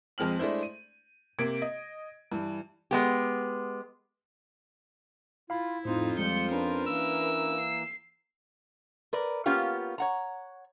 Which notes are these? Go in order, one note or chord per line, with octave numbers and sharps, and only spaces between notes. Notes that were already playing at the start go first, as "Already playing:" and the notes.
F2 G#3 C4 F6 F#7
G#3 A3 D4 E4 C5
D#7
C3 A#3 G#6 D7
D#5
G2 E3
G#3 B3 G4
E4 F4 F5 B5
F2 A2 C4 D#4 F4 C5
F3 G3 G#3 G6 C#7
C#4 D4 A#4 B4
E3 A#3 E6
C7
A#4 B4 D5
A#3 B3 C#4 F4 G4
C#5 F#5 A#5